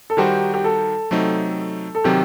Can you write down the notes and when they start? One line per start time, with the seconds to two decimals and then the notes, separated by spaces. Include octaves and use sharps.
0.10 A4
0.17 D#3 G3 D#4 F#4 G4 C5
0.54 G4
0.64 A4
1.11 C3 F#3 A3 C4 D#4
1.95 A4
2.04 C3 D#3 F#3 C4 G4